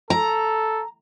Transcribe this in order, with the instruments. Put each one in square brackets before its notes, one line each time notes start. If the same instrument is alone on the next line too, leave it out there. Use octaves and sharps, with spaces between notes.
[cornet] A4 [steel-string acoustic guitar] A#5